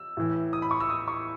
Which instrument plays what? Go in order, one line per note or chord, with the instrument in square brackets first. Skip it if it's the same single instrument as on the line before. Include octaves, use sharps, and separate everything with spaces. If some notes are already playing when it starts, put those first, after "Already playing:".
Already playing: [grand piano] E6
A2 E3
D#6
B5
C#6
E6
D#6
C#6